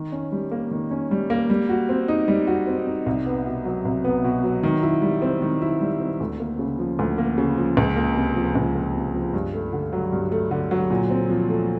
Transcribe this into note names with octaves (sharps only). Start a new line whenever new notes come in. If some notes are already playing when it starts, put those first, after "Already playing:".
Already playing: D#3
C#4
G3
A#3
D#3
C#4
G3
A#3
G3
F#4
C4
D#4
G3
F#4
C4
D#4
C2
B3
B2
F#3
C2
B3
B2
F#3
D#3
E4
G3
C4
D#3
E4
G3
C4
D2
A#3
C#3
F3
D2
A#3
C#3
F3
C#2
A#3
C3
F3
C#2
A#3
C3
F3
G2
A3
D3
F#3
G2
A3
D3
F#3
A#2
C4
F3
A3